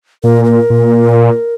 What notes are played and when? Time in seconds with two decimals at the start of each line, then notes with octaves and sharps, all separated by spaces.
0.24 A#2 A#4
0.44 A#4
0.70 A#2